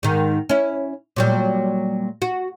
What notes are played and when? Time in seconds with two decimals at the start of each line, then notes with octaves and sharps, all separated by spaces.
0.03 G#2 D#3
0.49 C#4 E4
1.16 A#2 F#3 G3
2.22 F#4